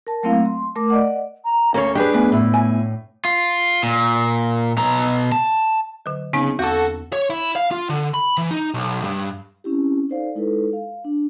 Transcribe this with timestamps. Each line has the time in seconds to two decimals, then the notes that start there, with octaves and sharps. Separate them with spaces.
0.07 A#4 A5
0.23 F#3 A3 A#3 C4 E4 F5
0.46 C6
0.76 A3 A#4 D6
0.90 D5 D#5 F#5
1.45 A#5
1.74 D2 A#3 C#4 A4 C#5
1.95 D4 G4 G#4 B4
2.14 F#2 A3 B3 G#5
2.32 A2 E4
2.54 G#5
3.25 F4
3.83 A#2
4.78 B2 A#5
5.32 A5
6.06 D3 F#3
6.33 C#3 B3 C4 D#4
6.59 E2 F#4 A4 D6
7.13 C#5
7.30 E4
7.56 F5
7.71 F4
7.89 D3
8.14 B5
8.38 E3
8.51 D#4
8.74 B1
9.04 G2
9.64 C4 C#4 E4 G4
10.09 D#4 A4 C5 D5 F5
10.35 G#3 D#4 E4 A4 B4
10.73 F5
11.05 D4